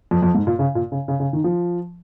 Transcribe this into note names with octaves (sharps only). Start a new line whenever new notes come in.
F2
F2
G#2
A#2
C#3
A#2
C#3
C#3
C#3
D#3
F3